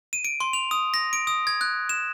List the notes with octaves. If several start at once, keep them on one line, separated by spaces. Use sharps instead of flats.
D#7
D7
C6
F7
D#6
A#6
D7
D#6
G#6
F#6
E7